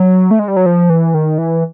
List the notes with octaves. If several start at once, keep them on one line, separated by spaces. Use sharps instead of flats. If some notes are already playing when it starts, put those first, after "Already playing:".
Already playing: F#3
A3
G#3
G3
F#3
F3
E3
D#3
E3